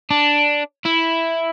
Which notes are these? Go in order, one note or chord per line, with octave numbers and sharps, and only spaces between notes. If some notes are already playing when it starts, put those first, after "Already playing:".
D4
E4